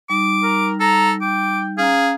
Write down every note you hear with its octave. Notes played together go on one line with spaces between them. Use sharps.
G3 D#4 D6
A#4
A4 A#5
G5 D6
C#4 G#4 F5 A#5